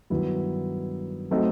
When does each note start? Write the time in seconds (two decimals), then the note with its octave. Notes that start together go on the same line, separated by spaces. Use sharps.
0.10 G2 D#3 F#3 B3 E4
1.31 F#3 A3 C4 D#4